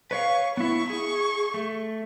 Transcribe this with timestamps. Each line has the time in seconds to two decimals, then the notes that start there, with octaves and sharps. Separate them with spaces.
0.11 B4 C#5 F5 C#6
0.57 B3 E4 C#6
0.90 G#4 C#6
1.54 A3